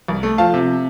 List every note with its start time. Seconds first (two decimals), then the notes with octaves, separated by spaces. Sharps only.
0.08 C2
0.23 A3
0.38 F3 F5 A5
0.54 C3